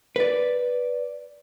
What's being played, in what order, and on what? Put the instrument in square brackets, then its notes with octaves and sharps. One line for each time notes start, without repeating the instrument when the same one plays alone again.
[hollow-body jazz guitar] B4 D5